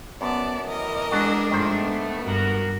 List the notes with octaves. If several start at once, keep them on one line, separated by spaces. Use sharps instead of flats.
F#2 B3 D5 A5
A2 E3 A#4 D#5
G#3 D4 F#4 A5
G#2 D#3 F3 A3 C5
B3
G2 F#4 A#4